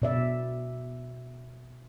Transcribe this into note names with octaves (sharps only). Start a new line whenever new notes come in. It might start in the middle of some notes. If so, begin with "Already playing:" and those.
B2 D5 E5